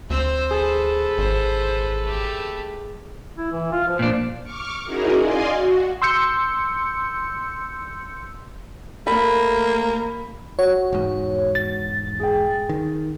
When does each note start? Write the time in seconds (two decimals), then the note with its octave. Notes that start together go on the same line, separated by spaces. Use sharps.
0.10 D2 C4 C5 E6
0.51 G#4 A4 B4
1.18 G#1 C5
2.04 A3 G4
3.37 E4
3.52 E3
3.72 F4
3.88 F3
3.99 A#2 F3 D4
4.43 C#6 D6 F6
4.84 C#4 D#4 E4 F#4 G#4 A#4
5.18 D5 D#5 F5 G#5 C6
5.51 F#4
6.02 C6 E6 G6 C#7
9.07 A3 A#3 B5
10.59 F#4 C#5
10.93 E1 G#2
11.55 A6
12.20 G#4 G5
12.69 D#3